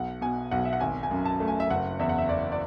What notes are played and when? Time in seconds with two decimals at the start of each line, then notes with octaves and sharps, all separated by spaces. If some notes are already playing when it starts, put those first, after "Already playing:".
Already playing: B1 F#5
0.21 B2 G#5
0.51 B1 F#5
0.65 E5
0.73 F#5
0.80 G#1 G#5
1.03 G#5
1.11 F#2
1.25 A5
1.40 A3
1.48 G#5
1.60 E5
1.70 F#1 F#5
1.99 E2 E5
2.09 F#5
2.18 E5
2.29 F#1 D5
2.52 D5